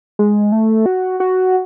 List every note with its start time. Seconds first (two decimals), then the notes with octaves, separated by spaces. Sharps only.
0.19 G#3
0.52 A3
0.86 F#4
1.20 F#4